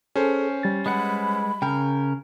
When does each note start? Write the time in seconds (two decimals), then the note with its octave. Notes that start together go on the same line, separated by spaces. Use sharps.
0.16 C#4 G#4 A4 C5
0.63 G3 A6
0.86 G#3 B4 F#5 B5
1.62 C#3 A#4 G5